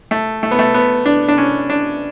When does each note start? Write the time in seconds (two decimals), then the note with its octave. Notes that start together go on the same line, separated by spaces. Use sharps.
0.11 A3
0.43 A3
0.51 B3
0.59 A3
0.74 B3
1.06 D4
1.28 D4
1.38 C#4
1.70 D4